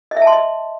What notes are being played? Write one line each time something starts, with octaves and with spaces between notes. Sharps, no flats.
D#5
E5
A5
C6
D#5